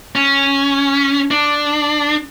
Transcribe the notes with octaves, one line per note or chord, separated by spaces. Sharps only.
C#4
D4